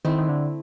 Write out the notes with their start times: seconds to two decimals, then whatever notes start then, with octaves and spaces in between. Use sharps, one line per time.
0.05 D#3 A3 C4 E4
0.18 D#3
0.29 D3